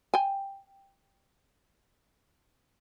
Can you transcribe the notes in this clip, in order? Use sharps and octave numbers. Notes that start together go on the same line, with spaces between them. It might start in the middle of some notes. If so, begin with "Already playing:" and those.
G5 G#5